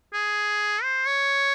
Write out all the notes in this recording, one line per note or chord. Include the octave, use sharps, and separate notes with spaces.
G#4
C5
C#5